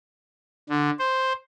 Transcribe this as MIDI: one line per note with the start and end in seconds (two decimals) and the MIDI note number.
0.69 0.90 50
0.99 1.33 72